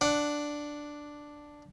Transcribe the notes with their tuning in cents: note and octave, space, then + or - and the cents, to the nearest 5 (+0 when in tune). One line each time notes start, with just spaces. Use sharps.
D4 +0 F#5 +0